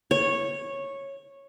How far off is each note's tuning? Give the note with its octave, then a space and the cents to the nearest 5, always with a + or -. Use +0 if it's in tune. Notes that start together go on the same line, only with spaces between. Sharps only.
C#5 -10